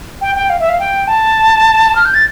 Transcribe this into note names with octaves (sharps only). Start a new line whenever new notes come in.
G5
G5
F5
E5
F5
G5
A5
F6
G6
A6